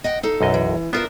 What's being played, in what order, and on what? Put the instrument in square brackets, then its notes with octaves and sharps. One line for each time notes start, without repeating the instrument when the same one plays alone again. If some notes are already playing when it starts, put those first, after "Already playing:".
[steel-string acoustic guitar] D#5 F#5 G5
D#4 A4 F5
[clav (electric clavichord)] B1 F#2 D#5
[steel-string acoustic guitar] E3
[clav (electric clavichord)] B3 F4 [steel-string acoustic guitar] D4 A#4 E5